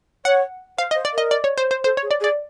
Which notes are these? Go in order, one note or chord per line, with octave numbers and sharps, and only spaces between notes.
C#5 F#5
C5 F5
D#5
C5
D5
A#4 D#5
D5
C#5
C5
C5
A4 C5
C#5
G#4
D5
G#4
D5